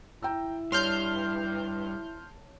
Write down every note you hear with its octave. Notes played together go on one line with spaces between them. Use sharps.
E4 G5 A#5 E6
G2 C#5 A5 C6 F6 G6